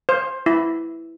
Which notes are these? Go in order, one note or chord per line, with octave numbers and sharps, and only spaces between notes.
C5
E4